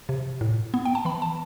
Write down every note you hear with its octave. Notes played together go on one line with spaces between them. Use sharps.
C3
A2
B3
G5
A5
E3 B5
A5